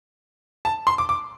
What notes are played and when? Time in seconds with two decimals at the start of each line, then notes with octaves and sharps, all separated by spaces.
0.65 A5
0.87 C6
0.98 D6
1.09 D6